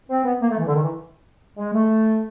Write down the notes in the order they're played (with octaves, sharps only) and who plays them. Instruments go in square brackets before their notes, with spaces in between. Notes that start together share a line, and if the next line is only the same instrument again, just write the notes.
[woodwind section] C4
B3
A#3
A3
E3
D3
D#3
E3
G#3
A3